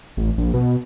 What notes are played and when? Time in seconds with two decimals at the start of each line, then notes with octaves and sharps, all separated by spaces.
0.17 A1
0.38 A#1
0.54 B2